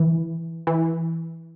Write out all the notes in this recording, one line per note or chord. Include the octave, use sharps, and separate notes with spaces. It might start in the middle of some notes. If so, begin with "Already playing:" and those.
Already playing: E3
E3